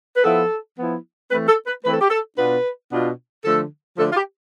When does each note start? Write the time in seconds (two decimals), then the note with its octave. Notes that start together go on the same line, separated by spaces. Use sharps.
0.17 B4
0.24 F3 B3 E4 A4
0.77 F3 B3 E4
1.30 E3 A3 C4 B4
1.49 A4
1.67 B4
1.84 E3 A3 C4 B4
1.93 A4
2.01 G4
2.10 A4
2.38 B2 B3 D4 F4 B4
2.91 B2 B3 D4 F4
3.44 D3 F3 A3 A4
3.98 D3 F3 A3 A4
4.12 F4
4.16 G4